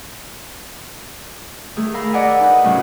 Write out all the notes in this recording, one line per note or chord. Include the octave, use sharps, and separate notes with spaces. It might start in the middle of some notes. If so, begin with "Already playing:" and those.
D#3 A3 G#4
A#4 F5 B5 E6
D5 D#5 F#5 G#5
D#4 B4
A2 C#3 F#3 C#4 F4